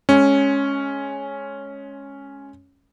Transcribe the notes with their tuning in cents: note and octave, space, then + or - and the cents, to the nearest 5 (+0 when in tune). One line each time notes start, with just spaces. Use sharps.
G#3 +20 C#4 +0